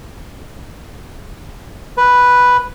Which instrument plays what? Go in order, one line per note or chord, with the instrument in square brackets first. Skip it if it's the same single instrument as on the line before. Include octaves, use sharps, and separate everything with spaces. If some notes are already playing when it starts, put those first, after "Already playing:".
[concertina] B4